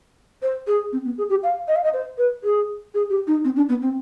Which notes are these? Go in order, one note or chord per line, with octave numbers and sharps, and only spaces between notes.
C5
G#4
C4
B3
G#4
G4
F5
D#5
F5
D#5
C5
B4
G#4
G#4
G4
D#4
C4
D4
B3
C4